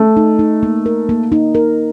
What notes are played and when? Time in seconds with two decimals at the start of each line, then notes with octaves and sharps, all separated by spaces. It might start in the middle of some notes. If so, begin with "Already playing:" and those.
Already playing: A3
0.17 D#4
0.39 D#4
0.63 A#3
0.86 A#4
1.09 A#3
1.32 D#4
1.55 A#4